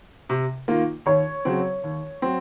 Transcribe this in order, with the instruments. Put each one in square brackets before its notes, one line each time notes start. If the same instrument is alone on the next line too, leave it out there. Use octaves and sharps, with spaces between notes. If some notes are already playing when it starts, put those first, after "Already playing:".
[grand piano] C3
D#3 A#3 F4
[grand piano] D#2 [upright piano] C#5
[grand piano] C#3 F#3 C4
D#2
F#3 C4